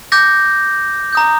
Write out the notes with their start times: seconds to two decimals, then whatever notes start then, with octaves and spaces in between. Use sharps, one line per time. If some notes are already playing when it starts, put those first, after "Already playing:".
0.12 D6 G6 A#6
1.13 A#5 D#6 G6